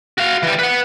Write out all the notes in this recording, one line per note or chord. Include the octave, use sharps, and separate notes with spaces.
F#4 F5
E3 G3
B4 F#5